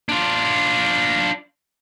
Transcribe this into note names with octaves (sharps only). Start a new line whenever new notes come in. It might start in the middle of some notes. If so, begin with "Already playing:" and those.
D4 F4